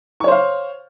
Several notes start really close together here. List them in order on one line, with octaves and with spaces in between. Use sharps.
C#6 C#5 C5 F5